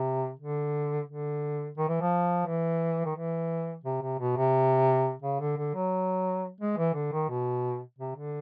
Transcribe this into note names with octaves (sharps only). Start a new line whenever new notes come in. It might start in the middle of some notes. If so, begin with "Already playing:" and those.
Already playing: C3
D3
D3
D#3
E3
F3
E3
D#3
E3
C3
C3
B2
C3
C#3
D3
D3
F#3
G#3
E3
D3
D#3
B2
C3
D3